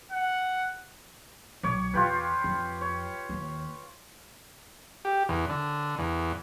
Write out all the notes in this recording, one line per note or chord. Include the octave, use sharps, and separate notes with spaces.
F#5
B1 C#5 D6
E2 F4 G4 B4
F2
C#5
D#2
G4
E2
D3
E2